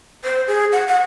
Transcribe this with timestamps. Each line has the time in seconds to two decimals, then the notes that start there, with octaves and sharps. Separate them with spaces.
0.24 C5
0.48 G#4
0.73 F#5
0.88 F#5